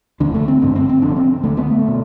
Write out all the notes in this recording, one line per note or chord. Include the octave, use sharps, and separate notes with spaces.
E1 D2 D3 D4
A3
C4
A1 G2 D3 C4
C4
C4
F1 F2 D3 D4
C4
D2 D3 A3
B3
A3
B2